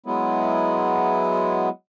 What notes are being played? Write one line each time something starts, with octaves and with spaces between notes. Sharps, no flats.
F#3 G#3 B3 E4